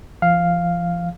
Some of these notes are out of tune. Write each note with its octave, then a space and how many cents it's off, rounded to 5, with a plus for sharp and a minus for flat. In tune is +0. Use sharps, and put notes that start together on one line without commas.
F3 -35 F5 +0